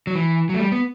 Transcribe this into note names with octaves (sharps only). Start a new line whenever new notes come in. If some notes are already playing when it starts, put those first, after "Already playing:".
F#3
E3
F#3
A3
G3
B3